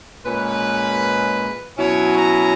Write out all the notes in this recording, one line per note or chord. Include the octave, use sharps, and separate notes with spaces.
A#2 G#3 C#4 B4
B2 F#3 C#4 E4 C#5
A#5